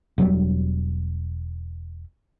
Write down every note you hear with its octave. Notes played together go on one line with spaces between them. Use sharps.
E1 F#3 G3